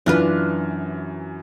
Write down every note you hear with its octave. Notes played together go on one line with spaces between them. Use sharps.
F#2 E3 D4 F4 B4 F6